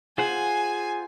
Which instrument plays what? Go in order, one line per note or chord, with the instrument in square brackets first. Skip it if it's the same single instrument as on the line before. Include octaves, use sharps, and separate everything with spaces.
[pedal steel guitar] F4 C5 F#5 [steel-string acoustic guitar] G#4 [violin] G#5